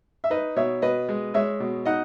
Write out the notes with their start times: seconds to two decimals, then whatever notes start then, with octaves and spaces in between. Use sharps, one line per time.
0.24 E5
0.30 D#4 B4 D#5
0.56 B2 C#5 E5
0.82 B2 B4 D#5
1.09 G#3
1.34 G#3 C#5 E5
1.60 B2
1.85 D#4 D#5 F#5